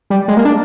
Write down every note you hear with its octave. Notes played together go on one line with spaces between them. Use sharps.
G3
G#3
A#3
D4